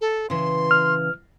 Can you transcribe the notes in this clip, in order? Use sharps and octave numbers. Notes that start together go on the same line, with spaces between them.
A4
C#3 E3 C6
F6